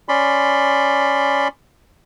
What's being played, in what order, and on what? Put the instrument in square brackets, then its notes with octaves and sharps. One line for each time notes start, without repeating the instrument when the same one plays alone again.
[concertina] C#4 D5 B5 C6